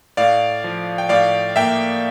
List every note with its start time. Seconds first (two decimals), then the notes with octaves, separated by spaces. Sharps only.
0.17 A2 D5 F5
0.64 F3
0.98 G5
1.09 A2 D5 F5
1.56 A#3 E5 G5